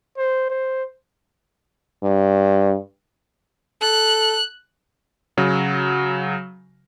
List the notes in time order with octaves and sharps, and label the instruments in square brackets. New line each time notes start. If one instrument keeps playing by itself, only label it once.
[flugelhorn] C5
C5
[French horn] G2
[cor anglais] A4 [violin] F#6
[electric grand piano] C#3 F#3